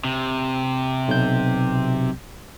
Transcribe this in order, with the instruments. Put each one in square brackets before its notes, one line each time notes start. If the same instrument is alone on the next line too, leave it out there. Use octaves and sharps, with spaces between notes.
[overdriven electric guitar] C3
[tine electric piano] B1 G6